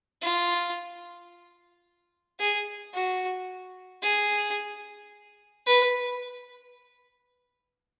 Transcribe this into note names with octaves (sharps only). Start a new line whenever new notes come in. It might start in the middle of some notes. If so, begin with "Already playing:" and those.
F4
G#4
F#4
G#4
B4